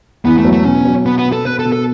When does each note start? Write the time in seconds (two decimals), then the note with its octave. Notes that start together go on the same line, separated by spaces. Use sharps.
0.25 E2 B3
0.38 A3
0.45 F#3
0.52 A3
0.65 B2 C#4
0.85 F#3
1.05 B2 B3
1.18 B3
1.26 B2
1.33 A4
1.45 B2 B4
1.59 A4
1.65 B2
1.72 A4